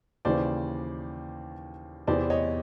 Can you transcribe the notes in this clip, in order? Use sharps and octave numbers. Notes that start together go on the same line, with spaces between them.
D#2 C#3 E3 C5 D5
E2 C3 E3 C5 D5
C#5 D#5